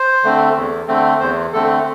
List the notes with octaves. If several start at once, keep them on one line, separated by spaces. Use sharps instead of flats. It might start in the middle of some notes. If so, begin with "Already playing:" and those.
Already playing: C5
D3 A3 C4
E2
D3 A3 C4
E2 C5
D3 A3 C4 A4